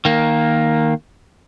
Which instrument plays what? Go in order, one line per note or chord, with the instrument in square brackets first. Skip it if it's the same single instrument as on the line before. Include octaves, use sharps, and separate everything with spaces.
[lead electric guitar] D#3 A#3